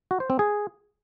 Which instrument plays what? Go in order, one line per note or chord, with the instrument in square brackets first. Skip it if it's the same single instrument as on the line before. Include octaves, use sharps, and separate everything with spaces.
[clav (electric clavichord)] F#4
C5
C4
G#4